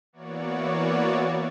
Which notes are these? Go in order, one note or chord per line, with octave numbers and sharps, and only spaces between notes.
E3 A#3 B3 F#4 C#5 D5